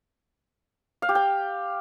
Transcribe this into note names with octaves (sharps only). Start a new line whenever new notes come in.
F5
G4
G5